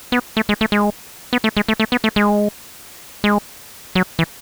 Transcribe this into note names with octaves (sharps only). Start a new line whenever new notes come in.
B3
A3
G#3
A3
G#3
B3
A3
G#3
A3
A3
B3
A3
G#3
G#3
F#3
E3